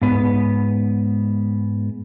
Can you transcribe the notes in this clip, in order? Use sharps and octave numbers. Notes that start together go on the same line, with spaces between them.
G#2 B3